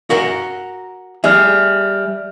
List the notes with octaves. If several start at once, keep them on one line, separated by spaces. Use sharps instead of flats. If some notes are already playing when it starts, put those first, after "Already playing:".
F#4 A#4 F#5
G3 G#4 E5 F6